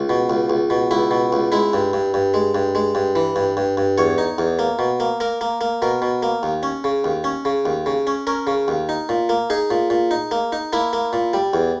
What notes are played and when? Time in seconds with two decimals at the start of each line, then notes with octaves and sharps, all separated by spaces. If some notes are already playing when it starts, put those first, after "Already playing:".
Already playing: C#2
0.09 B2
0.30 C#2
0.50 C#2
0.70 B2
0.91 C#2 E4
1.11 B2
1.33 C#2
1.52 G#3 E4
1.73 G2
1.93 G2
2.14 G2
2.34 G#3
2.55 G2
2.75 G#3
2.95 G2
3.16 E3
3.36 G2
3.57 G2
3.77 G2
3.98 E2 C#5
4.18 D#4
4.38 E2
4.59 A#3
4.79 B2
5.00 A#3
5.20 A#3 A#4
5.41 A#3
5.61 A#3
5.82 B2 A#4
6.02 B2
6.23 A#3
6.43 D#2
6.63 C#4
6.84 C#3
7.04 D#2
7.24 C#4
7.45 C#3
7.65 D#2
7.86 C#3
8.07 C#4
8.27 C#4 A#4
8.47 C#3
8.68 D#2
8.89 D#4
9.09 A#2
9.29 A#3
9.50 D#4 G#4
9.70 A#2
9.90 A#2
10.11 D#4
10.31 A#3
10.52 D#4
10.73 A#3 E4
10.93 A#3
11.13 A#2
11.33 G3
11.54 E2